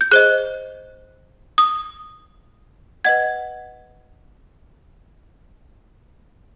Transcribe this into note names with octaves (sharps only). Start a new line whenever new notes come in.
G6
G#4 C5 D#5 F#6
D#6
B4 D#5 F#5 G#6